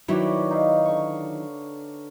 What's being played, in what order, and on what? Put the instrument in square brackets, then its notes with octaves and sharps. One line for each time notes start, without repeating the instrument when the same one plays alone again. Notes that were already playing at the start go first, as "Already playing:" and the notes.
[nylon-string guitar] D#3 F#3 E4 [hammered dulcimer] B4 C#5 D5
[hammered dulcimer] D#4 F5
D3 C#6